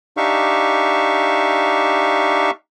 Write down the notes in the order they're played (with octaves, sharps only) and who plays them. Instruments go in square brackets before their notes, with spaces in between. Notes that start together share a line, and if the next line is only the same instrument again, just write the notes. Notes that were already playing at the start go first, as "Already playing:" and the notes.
[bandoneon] D4 D#4 G4 E5 F5 C#6